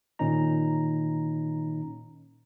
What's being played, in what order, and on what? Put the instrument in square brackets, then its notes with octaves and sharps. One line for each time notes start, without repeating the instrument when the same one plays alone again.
[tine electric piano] A#2 D#3 C#4 D#4 A#5